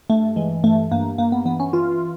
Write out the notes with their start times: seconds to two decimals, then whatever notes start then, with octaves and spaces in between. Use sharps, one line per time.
0.10 G2 A3
0.36 E3 G#3
0.64 G2 A3
0.92 G2 A#3
1.18 G2 A#3
1.32 B3
1.45 E3 B3
1.60 C#4
1.73 E3 F4